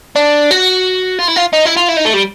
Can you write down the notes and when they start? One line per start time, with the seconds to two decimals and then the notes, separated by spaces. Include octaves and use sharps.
0.16 D4
0.51 F#4
1.19 F4
1.28 E4
1.36 F4
1.53 D#4
1.65 E4
1.76 F4
1.88 E4
1.97 D#4
2.05 A3
2.13 G3